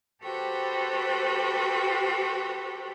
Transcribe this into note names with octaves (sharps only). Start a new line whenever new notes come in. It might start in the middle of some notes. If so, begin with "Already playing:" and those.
F#4 G4 A4 B4 C5 G5